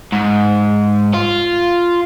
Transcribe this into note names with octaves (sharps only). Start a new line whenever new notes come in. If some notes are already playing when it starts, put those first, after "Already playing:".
G#2
F4